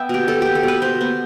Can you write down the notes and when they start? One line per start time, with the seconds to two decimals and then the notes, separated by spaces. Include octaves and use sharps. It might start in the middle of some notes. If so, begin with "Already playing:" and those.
Already playing: B3 E5 G5
0.09 B2 G4
0.28 B2 A4
0.42 B3 G4
0.55 A4
0.63 B2 B4
0.82 B2 C5
1.01 B3